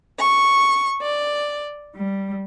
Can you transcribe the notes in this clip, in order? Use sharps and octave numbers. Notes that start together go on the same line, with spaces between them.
C#6
D5
G3